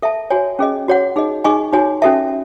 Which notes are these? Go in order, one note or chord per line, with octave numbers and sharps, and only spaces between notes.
A4 E5 A5
F#4 C#5 G#5
C#4 G#4 D#5
F#4 C#5 F#5
D#4 G#4 D#5
D#4 G#4 D#5 G#5 C#6
D#4 F#4 C#5 G#5
C#4 F#4 A4 E5 A5